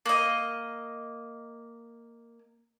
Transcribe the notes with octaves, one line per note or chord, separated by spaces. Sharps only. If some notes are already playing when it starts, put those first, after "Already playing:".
A#3 D#5